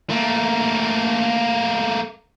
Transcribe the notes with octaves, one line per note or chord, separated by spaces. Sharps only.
A3 A#3